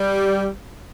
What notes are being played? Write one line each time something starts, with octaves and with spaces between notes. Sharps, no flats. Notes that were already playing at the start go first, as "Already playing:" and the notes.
Already playing: G3